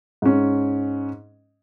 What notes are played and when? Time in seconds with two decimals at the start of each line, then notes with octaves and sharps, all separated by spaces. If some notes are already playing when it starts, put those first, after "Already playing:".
0.22 G#2 C#4